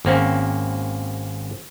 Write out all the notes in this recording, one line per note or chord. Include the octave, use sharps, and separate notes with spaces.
G#1 A#3 C4 C#4